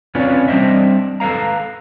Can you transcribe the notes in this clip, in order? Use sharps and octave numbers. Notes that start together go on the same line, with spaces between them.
C4 C#4 F4 B4 C#5 D5
G3 C4 D4 C5 D#5 E5
A4 B4 C#5 F5 A#5